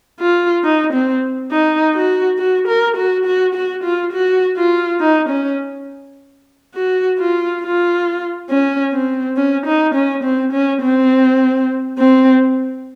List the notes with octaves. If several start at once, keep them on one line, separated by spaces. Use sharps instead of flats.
F4
D#4
C4
D#4
F#4
F#4
A#4
F#4
F#4
F#4
F4
F#4
F4
D#4
C#4
F#4
F4
F4
C#4
C4
C#4
D#4
C#4
C4
C#4
C4
C4